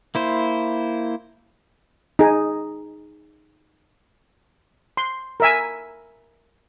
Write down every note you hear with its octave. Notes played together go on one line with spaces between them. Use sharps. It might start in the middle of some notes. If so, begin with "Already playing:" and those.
A#3 E4 C5
D#4 G#4
C6
A#4 E5 G#5